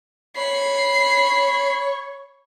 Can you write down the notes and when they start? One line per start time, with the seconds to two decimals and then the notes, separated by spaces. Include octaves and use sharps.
0.37 C#5 B5 C7